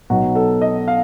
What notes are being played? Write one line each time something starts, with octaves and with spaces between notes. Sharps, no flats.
B1 B2 F#3 F#4
A4
D#5
F5